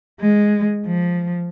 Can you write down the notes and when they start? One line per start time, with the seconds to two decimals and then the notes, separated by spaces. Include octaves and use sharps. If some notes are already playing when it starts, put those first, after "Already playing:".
0.20 G#3
0.85 F3